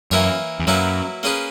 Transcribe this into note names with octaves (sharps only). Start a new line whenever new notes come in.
F#2 E3 A#3 E4 A#4 C#5
E2
F#2 F#3 A#3 E4 B4
A#3 C#4 G#4 B4